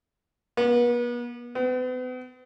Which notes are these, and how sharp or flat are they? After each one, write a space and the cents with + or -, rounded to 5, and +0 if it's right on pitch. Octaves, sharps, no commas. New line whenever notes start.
B3 -40
B3 +40